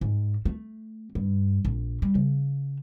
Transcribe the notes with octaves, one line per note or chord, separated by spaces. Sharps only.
G#2
A3
G2
A#1
G3
C#3